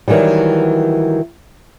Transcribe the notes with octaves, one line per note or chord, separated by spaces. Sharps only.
D#3 E3 F#3 G3